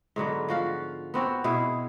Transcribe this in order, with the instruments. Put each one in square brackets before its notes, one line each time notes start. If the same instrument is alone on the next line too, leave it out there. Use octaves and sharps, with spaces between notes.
[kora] G#2 D3 F#3 B3
F3 F#4 F5
B3 C4 F#4 C#5
B2 B3 E4 G#4